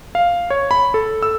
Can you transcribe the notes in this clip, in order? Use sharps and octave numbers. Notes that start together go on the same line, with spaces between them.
F5
C#5
B5
A4
E6